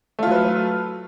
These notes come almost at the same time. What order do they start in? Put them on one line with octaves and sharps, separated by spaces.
A3 F4 F#3 B4